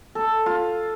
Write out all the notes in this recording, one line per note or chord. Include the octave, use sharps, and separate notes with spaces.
A4
F4